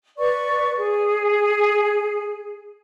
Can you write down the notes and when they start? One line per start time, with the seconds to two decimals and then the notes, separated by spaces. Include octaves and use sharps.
0.18 B4 D5 C#6
0.77 G#4